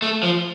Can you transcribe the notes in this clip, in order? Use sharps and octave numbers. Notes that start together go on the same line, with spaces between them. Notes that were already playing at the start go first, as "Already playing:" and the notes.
A3
F3